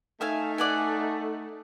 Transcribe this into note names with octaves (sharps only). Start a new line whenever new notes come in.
A3 D#4 E5 F5 G#5
D5 F#5 G#5